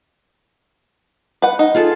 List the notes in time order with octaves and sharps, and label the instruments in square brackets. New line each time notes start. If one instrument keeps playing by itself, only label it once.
[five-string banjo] B4 F#5
D#4
[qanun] F4 G#4 A4